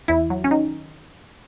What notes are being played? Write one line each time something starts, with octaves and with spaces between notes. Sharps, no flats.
E2 E4
F#3
C#4
D#3 D#4